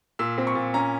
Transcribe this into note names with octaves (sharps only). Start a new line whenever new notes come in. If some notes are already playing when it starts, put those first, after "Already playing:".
A#2 E6
C4
C#6
A#2
C#4 A#5